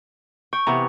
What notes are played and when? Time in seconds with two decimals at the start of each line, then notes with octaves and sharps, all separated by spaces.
0.53 G5 C#6
0.67 C3 E3 B3 G4 A#5